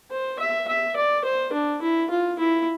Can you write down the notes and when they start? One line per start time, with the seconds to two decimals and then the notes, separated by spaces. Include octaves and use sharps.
0.11 C5
0.39 E5
0.68 E5
0.96 D5
1.24 C5
1.53 D4
1.82 E4
2.10 F4
2.39 E4